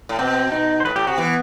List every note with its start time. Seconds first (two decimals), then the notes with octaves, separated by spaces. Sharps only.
0.09 A2
0.19 B2 C4
0.52 D#4
0.80 C5
0.85 A2 B4
0.96 A2 G4
1.07 C3 F#4
1.18 E3 B3